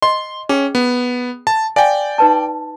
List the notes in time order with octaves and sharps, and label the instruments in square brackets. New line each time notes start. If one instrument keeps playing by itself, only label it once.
[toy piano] D#5 [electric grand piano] C6
[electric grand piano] C#4 [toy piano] G#4 G5
[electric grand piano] B3
A5
[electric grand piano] D5 G5 [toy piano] F5 G#5
[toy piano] D#4 B4 A5